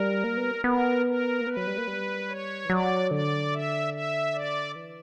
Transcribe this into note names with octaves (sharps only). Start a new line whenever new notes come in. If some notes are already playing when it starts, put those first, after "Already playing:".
Already playing: G3 A#4
A#3
B3
B3 A#4
A#4
A#3
B3 B4
F#3
G3
A#3
G3
C#5
E3
F#3 D5
D3 D5
E5
E5
D5
E3